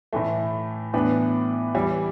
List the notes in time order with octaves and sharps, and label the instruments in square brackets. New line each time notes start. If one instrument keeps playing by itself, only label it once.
[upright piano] A2 E3 A3
A2 E3 B3 D4 B4
E3 G3 E4